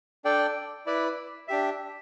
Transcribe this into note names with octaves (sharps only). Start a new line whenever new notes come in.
D4 A4 D5 G5
E4 B4 D5
D4 G4 E5